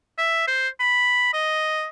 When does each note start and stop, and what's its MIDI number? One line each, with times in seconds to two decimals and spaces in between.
0.18 0.43 76
0.47 0.68 72
0.80 1.31 83
1.33 1.86 75